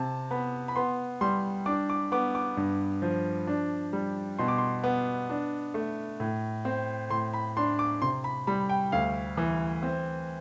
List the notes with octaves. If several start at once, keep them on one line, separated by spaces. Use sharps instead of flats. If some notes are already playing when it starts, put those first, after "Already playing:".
Already playing: C3 A5
B3 B5
B5
B3 C6
G3 C6
D4 D6
D6
B3 D6
D6
G2
F3
D4
G3
B2 C6
D6
C6
B3
D4
A3
A2
C4
A2 C6
B5
D4 C6
D6
C3 C6
B5
G3 B5
G5
D2 F5
E3
C4